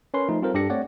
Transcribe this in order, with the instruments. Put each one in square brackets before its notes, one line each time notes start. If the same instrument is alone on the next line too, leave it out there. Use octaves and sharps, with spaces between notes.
[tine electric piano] C#4 A#4 B4 C#5 C6
F3 A3 D#4
G3 C4 F4 A4 A#4 C5
G2 D4 G4 A4 A#6 C#7
A3 C4 C#5 D5 F#5